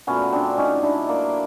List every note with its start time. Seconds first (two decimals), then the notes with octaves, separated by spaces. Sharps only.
0.07 A#2 F#3 A3 B3 C#4
0.32 C4 D4
0.58 C#4 D#4
0.83 D4 E4
1.09 A#3